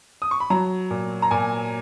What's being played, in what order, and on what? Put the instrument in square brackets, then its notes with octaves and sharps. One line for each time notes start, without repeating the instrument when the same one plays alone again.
[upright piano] D#6
C#6
B5
F#3 A#5
A#2
A#5
A#2 G#5